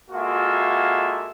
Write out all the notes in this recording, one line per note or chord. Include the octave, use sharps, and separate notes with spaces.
G#3 A#3 F4 F#4 A4 E5